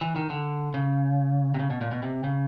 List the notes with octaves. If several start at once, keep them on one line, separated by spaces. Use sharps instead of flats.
E3
D#3
D3
C#3
C3
C#3
B2
A#2
B2
C3
C#3